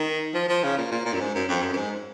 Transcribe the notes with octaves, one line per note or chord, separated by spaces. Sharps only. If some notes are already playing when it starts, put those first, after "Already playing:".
Already playing: D#3
F3
F3
C#3
A#2
A#2
A#2
F#2
G#2
F#2
F2
F#2
F#2
G#2